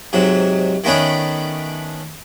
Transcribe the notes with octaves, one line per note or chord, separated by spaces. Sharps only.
G#2 C3 F#3
D#3 A3 B3 C#4 D4